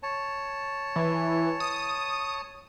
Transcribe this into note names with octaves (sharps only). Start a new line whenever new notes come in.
C#5 A5
E3
D#6